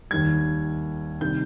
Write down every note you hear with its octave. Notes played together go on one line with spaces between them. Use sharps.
D#2 D#3 G3 G#6
C3 D#3 G3 G6